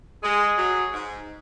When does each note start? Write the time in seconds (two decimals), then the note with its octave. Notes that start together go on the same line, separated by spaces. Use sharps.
0.23 G#3 G#4
0.58 F#3
0.93 G#2